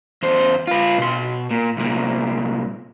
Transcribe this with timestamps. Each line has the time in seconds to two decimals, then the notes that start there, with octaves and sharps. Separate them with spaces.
0.23 E2 C5
0.67 F4 B4
0.99 B2 C6
1.51 A#2
1.77 C2 A#2